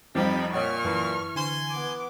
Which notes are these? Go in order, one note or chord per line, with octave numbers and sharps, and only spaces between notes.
F2 F3 G3 C4 D#4 G4 B5
A#2 C#5 D#5 F#5 C#6 F6
F#2 E3 A5 B5
D3 G#5 C6
B3 D6